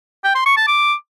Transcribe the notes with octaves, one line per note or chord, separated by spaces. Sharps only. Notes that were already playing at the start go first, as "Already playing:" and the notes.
G5
C6
C#6
A5
D6